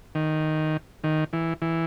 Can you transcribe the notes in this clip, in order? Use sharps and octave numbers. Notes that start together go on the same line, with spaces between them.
D#3
D#3
E3
E3